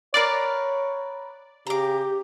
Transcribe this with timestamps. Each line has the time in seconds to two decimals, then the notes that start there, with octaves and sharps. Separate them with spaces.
0.14 A#4 B4 C#5 D5 F5
1.67 C#3 G4 A#5 D6